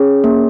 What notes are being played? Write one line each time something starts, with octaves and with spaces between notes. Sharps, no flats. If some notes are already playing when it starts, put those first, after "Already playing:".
Already playing: C#4 G#4 C#5
A#3